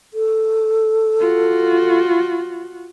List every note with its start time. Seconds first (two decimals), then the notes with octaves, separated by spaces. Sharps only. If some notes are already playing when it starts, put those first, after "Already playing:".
0.14 A4
1.19 F4 F#4